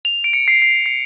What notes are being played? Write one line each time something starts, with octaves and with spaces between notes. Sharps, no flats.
F7
D7
C#7
C7
C7
C7